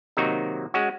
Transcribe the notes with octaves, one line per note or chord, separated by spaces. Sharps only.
C3 D#3 F#3 A#3 D#4 F#4
G#3 C#4 F#4